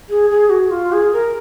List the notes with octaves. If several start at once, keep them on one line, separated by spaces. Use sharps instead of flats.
G#4
G#4
F#4
F4
G#4
A#4